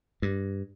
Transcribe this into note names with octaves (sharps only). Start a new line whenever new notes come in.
G2